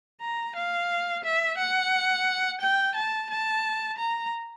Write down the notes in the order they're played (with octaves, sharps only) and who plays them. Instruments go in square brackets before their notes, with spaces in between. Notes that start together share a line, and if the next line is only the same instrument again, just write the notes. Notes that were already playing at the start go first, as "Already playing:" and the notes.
[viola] A#5
F5
E5
F#5
G5
A5
A5
A#5